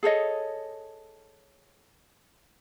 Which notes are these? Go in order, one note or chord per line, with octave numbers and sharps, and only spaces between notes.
G#4 A4 C#5 D#5